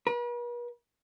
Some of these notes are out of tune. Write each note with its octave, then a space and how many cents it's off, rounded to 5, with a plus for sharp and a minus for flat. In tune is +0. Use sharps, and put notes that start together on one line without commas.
B4 -45